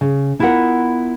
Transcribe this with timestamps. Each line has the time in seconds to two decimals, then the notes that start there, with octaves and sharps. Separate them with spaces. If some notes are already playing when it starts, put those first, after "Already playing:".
0.01 C#3
0.39 B3 E4 F4 A4 A#4 F#5